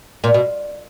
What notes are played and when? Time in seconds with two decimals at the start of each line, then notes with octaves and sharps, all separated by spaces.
0.24 A#2
0.34 B2